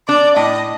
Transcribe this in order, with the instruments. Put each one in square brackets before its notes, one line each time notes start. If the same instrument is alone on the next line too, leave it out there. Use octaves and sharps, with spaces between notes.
[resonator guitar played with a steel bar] D4 [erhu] D5
[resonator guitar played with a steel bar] A2 [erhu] D#5